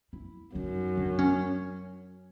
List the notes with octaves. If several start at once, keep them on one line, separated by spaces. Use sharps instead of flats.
E4
F#2 D#4
D4
C#4